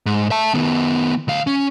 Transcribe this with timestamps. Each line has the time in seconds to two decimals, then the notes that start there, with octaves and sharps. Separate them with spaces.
0.06 G#2
0.31 E5 A5
0.54 D#3 B3
1.28 D2 F5
1.47 C#4